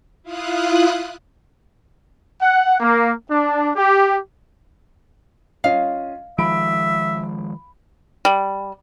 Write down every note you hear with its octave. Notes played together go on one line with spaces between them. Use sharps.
E4 F4 F5 D#6 F#6
F#5
A#3
D4
G4
C#4 F4 D#5 F5
D#3 F3 G#3 E5 B5 D7
G3